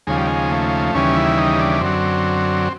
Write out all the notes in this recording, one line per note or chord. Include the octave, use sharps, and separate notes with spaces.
D#2 C#3 F3 G#3
G3
G#3
A3
D#2 C#3 E3 G3 C#4
E4
D#4
D4
F#2 D3 F#3 C4